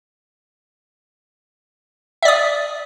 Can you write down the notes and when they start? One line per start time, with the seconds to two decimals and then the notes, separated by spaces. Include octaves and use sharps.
2.22 E5
2.25 D5
2.28 D#6